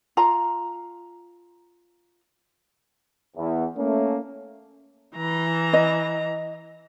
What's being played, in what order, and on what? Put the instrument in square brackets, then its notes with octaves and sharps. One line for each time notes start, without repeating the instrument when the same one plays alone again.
[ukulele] F4 A#5
[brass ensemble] E2
A3 A#3 C#4
[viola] E3 A#5
[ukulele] D#5